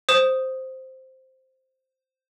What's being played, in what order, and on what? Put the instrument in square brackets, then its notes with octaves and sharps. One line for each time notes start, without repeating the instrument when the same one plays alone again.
[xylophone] C5 D#6 E7